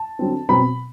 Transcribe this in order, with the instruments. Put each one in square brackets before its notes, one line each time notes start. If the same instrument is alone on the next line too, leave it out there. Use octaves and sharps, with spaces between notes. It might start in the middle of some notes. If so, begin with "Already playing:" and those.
Already playing: [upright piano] A5
D3 F#3 C4
B2 F#3 C4 B5